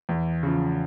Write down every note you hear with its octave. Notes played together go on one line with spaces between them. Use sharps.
E2
C#3 F3